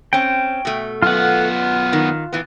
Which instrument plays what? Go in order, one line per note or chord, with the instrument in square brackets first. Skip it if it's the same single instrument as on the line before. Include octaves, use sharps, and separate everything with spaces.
[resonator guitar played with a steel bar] C4 C#4 [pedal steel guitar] G5
[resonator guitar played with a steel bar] B2 A3
[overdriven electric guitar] F#2 B3 [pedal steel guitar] F4 F#5
[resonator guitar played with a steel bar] D#3
A#2 E3 B3